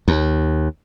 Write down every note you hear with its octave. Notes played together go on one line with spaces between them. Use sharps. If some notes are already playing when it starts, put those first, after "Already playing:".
D#2